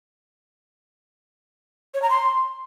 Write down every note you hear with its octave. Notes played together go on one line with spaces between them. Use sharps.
C#5
A#5
C6